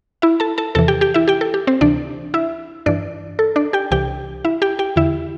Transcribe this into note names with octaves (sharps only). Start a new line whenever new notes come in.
E4 E5
A4 A5
A4 A5
E2 C3 E3 A4 A5
G4 G5
G4 G5
E4 E5
G4 G5
A4
G4
C4 C5
D2 C3 E3 D4 D5
E4 E5
G2 E3 D4 D5
A4
D4 D5
G4 G5
C2 C3 E3 G4 G5
E4 E5
G4 G5
G4 G5
E2 D3 E4 E5